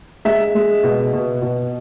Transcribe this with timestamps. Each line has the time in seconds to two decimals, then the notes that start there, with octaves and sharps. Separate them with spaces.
0.25 G#3 E5
0.55 G#3
0.84 B2
1.13 B2
1.42 B2